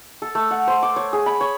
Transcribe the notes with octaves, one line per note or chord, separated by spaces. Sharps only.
A4
A3
F#5
C5
D6
C#5
G#4
B5
C#5